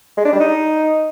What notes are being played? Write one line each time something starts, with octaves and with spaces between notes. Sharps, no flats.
G#3
D4
G3
D#4